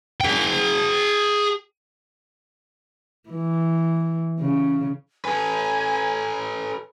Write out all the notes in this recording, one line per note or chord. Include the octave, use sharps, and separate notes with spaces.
G#4 G5
E3
C#3
A4 B4 G#5